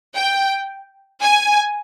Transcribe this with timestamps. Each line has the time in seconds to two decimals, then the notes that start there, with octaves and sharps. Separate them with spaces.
0.15 G5
1.22 G#5